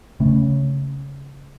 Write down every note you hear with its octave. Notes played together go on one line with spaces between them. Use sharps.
C#3 A3 C#4